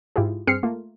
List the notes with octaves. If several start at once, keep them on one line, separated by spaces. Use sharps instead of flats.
G#2 E4 F4 G4 G#4
G2 C4 G#4 F6 C7 C#7
A3 A#3 F4